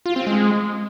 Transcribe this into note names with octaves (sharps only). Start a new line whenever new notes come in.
F4
C4
G#3